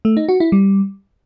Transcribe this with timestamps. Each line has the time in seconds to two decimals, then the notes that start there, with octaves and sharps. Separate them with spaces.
0.05 A3
0.17 D#4
0.28 F#4
0.40 E4
0.52 G3